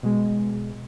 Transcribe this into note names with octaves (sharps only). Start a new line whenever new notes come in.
B2 G#3